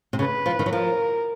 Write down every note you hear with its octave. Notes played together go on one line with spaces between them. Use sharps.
C3
C#3 B4
F3
D#3
F#3
F3 A#4